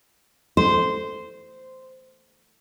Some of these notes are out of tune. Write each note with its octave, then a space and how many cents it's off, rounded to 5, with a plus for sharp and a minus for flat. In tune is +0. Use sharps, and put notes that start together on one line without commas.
C5 -10